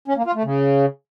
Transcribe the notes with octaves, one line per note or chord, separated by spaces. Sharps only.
C#4
A#3
F4
A3
C#3